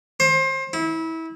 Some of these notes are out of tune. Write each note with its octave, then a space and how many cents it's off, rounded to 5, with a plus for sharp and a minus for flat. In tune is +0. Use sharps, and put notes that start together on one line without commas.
C5 +30
E4 -25